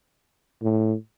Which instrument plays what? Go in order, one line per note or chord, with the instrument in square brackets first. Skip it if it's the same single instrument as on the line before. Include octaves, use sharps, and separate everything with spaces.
[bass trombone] A2